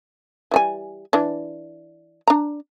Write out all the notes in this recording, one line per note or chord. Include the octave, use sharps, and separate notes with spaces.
E3 G3 G#5
E3 D4
D4 A#5